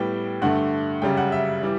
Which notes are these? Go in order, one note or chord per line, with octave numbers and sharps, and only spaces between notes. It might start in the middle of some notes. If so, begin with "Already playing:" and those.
Already playing: A2 G3 B3 G5
G2 D3 A3 F#5
F#2 C#3 G3 G5
F#5
E5
E3 G3